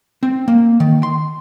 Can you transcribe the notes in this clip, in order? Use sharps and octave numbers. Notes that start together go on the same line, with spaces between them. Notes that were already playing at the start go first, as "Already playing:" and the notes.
C4
A#3
D#3
C6